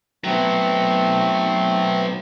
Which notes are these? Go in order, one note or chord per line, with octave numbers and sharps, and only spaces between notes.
F#3 A3 B3 C4